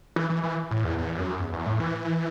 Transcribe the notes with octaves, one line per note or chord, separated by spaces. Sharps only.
E3
E3
E3
A2
E2
E2
F#2
E2
E2
A2
E3